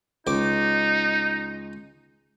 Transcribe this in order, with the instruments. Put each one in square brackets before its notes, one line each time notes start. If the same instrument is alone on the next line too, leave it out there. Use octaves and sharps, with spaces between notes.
[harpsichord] C#2 D6 [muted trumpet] D#4